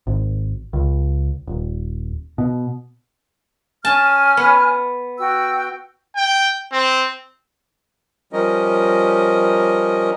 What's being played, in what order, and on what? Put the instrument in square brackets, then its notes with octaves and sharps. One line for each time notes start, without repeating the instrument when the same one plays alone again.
[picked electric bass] G#1
C#2
D#1
B2
[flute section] C#4 G#5 F6 [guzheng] A5
[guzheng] B3
[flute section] F#4 G5 E6
[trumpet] G5
C4
[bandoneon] F3 G3 C#4 A#4 D#5